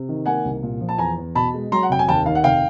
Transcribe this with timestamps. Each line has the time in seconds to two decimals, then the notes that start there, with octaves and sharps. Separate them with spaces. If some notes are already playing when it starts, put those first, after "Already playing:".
Already playing: C3
0.09 D#3
0.26 A#3 F#5 G#5
0.45 C2
0.63 A#2
0.81 F3
0.89 A5
0.98 E2 G#5 A#5
1.17 E2
1.35 B2 A5 B5
1.54 G#3
1.72 F#3 A#5 C6
1.83 F#5
1.90 F1 G5
1.99 G#5
2.08 D#2 G5 A5
2.26 D#3 F5
2.35 F#5
2.44 F1 F5 G5